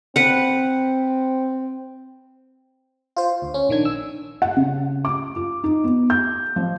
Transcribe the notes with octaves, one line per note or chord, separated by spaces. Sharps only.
C4 B4 F#5
F4 C5
D2
C#4
A#1 D#3 D4 G#6
E6
F#5
C#3
D6
F4
D#4
B3
G6
F3